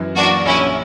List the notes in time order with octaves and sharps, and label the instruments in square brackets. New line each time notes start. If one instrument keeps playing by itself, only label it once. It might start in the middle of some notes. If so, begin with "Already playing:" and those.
Already playing: [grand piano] F#2 E3
[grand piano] A#3 [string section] D4 F#4
[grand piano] A#1 [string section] C#4 E4